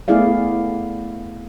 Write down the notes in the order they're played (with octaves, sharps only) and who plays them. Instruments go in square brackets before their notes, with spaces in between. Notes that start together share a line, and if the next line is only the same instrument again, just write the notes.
[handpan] A3 B3 E4 G#4 D5 F5